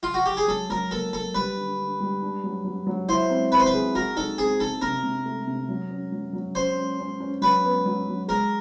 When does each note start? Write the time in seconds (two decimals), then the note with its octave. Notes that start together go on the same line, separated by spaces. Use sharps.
0.03 F4
0.14 F#4
0.26 G4
0.37 G#4
0.48 F#3 A4
0.70 F#3 A#4
0.91 A#3 A4
1.13 F#3 A4
1.34 G3 B4
1.57 D3
1.78 D3
2.00 G3
2.22 D4
2.44 F#3
2.65 F#3
2.87 F#3
3.09 E4 C5
3.30 C4
3.51 C4 B4
3.60 C5
3.66 B4
3.74 G#4
3.95 F#4 A#4
4.16 D#4 A4
4.38 C4 G#4
4.60 D#4 A4
4.82 C3 A#4
5.03 C3
5.26 A3
5.47 C3
5.69 F#3
5.91 C#4
6.12 F#3
6.33 F#3
6.55 C#4 C5
6.77 C#4
6.99 C#4
7.20 C#4
7.41 F#3 B4
7.64 B3
7.86 F#3
8.07 F#3
8.28 G#3 A#4